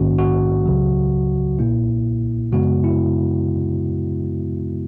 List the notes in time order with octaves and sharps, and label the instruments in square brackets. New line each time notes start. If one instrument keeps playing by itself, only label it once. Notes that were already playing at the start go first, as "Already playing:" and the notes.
Already playing: [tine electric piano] A#1 G#2 D#3 A#3 C#4 F#4
F#4
C#2 C#3 F#3
B1 A#2 A#3 E4
F#2 C#3 G#3 B3 F#4
E4